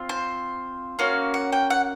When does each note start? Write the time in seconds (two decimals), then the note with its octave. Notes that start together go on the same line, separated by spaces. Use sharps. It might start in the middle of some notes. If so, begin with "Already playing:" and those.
Already playing: C4 F4
0.09 C5
0.99 A#3 C#4 F#4 F5
1.34 F#5
1.53 G5
1.70 F#5